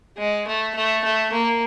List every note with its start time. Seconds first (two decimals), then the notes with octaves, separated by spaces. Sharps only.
0.18 G#3
0.47 A3
0.75 A3
1.04 A3
1.32 A#3